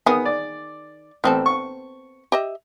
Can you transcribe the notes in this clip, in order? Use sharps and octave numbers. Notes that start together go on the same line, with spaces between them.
D#3 B3 G#4 D#6
D5
A1 B3 C4 A4
C#6
G4 D#5 E5